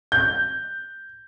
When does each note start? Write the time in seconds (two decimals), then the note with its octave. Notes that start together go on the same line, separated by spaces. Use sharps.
0.12 G6